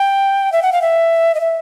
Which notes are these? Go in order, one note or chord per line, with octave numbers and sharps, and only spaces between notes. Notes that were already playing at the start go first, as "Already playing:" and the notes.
Already playing: G5
E5
F#5
F5
E5
D#5
E5